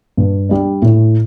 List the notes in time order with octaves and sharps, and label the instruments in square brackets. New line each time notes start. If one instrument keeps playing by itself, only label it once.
[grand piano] G2
G3 D4
A2